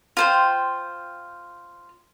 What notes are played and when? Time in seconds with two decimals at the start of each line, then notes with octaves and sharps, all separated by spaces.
0.17 F4 C5 G5